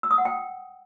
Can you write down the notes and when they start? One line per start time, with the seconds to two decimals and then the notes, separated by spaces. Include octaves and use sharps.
0.03 E6
0.11 D#6
0.18 F#5
0.25 G5